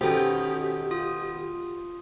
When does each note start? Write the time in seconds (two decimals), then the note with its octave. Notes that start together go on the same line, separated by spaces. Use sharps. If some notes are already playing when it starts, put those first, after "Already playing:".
0.01 B2 D#3 C#4 G4 A4 C5 G5
0.91 F4 D#6